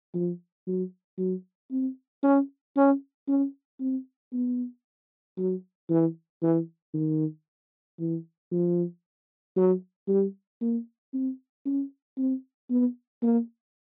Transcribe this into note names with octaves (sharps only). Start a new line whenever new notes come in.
F3
F#3
F#3
C4
C#4
C#4
C#4
C4
B3
F#3
E3
E3
D#3
E3
F3
F#3
G3
A#3
C4
C#4
C4
B3
A#3